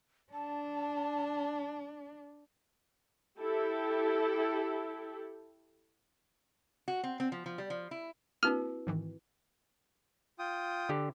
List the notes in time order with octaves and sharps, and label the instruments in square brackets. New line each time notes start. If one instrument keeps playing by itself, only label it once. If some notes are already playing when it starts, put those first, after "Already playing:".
[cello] D4 [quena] A5
[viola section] E4 G4 A4
[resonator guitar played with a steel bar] F#4
C4
C4
F3
F3
G3
F3
E4
[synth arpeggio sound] A#3 D4 [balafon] C4 F#4 [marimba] E4 B4 [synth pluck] F6
[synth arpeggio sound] G#2 D#3 E3
[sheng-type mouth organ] F4 G5 D#6
[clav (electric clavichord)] D3 G4